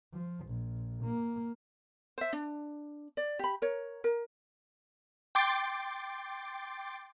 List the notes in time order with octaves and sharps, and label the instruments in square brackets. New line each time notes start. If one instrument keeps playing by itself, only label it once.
[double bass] F3
A#1
A#3
[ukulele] C5 E5
D4
D5
G4 B5
A#4 C#5
A#4
[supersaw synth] G5 C6 D6 A6